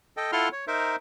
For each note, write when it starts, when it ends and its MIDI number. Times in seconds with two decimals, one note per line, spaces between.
0.17 0.31 69
0.17 0.31 75
0.17 0.31 79
0.32 0.49 64
0.32 0.49 65
0.32 0.49 69
0.32 0.49 78
0.32 0.49 84
0.32 0.49 89
0.52 0.65 73
0.67 0.96 63
0.67 0.96 70
0.67 0.96 72
0.67 0.96 76